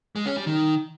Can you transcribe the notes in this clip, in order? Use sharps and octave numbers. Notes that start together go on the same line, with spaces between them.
G#3
C#4
G3
D#3